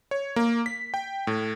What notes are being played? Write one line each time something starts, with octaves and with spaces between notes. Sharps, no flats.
C#5
A#3
B6
G5
A2